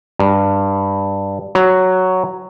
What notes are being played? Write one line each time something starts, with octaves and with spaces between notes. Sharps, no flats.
G2
F#3